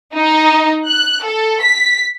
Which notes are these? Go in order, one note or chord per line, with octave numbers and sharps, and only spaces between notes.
D#4
F#6
A4
B6